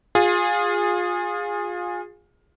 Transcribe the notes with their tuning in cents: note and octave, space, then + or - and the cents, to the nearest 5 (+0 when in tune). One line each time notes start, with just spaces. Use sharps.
F4 +25 G#4 -15